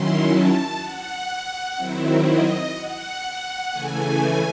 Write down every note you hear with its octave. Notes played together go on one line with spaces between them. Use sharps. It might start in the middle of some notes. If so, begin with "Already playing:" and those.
Already playing: D#3 F#3 C#4 E4 C6
A5
F#5
D#3 F#3 C4 E4
D#5
F#5
C#3 E3 A3 G#5